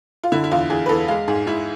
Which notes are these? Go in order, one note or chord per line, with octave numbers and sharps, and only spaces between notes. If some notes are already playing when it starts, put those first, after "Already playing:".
F4
D3 E4
E4
E2 F4
E2 G#4
B4
E2 A4
G#3 F5
G#2 G#4
G#2 E4